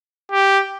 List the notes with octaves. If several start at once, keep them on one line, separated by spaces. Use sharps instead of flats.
G4